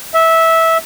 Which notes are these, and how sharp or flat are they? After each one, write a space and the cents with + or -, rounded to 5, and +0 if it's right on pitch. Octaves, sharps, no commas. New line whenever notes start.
E5 -15